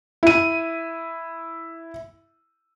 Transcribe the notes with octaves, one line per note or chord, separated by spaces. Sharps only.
E4 D#7